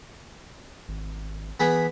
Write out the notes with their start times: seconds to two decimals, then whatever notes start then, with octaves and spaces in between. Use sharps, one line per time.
0.88 G#1
1.60 E3 B3 G#4 B5